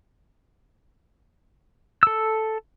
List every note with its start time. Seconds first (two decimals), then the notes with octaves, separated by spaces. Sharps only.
2.03 A4 E6